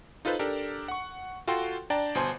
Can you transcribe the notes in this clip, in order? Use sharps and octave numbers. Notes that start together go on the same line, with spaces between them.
D#4 F4 A4 B4 C5
D4 G4 A4 A#4
F#5 C#6
F4 F#4 A4 G5 C6
D4 D5 G5 A5 A#5
G1 B2 C5 G#5 A5 C6